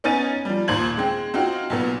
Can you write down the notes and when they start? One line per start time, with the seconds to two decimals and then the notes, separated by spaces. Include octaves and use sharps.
0.04 B3 C#4 D#4 G#5 A6 D#7
0.45 F3 G3
0.68 D#2 A#2 C5 G#6 F#7
0.97 G#3 C4
1.34 C4 D#4 F4 F#4
1.70 B1 A#2 B3